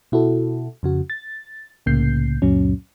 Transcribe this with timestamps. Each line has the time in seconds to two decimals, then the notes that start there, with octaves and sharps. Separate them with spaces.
0.12 B2 E4 F#4 A4
0.83 F2 C#3 F#4
1.10 A6
1.86 C2 A2 C#3 A#3 G6 C7
2.42 C#2 F#2 A#2 F#3 C#4